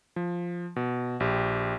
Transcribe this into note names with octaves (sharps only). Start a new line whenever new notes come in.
F3
B2
A#1 G4